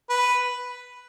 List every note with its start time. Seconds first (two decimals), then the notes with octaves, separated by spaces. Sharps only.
0.10 B4